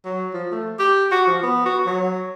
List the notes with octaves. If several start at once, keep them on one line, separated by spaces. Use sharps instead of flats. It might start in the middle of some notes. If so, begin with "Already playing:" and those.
F#3
F3
A3
G4
F#4
F3
B3
F#4
F#3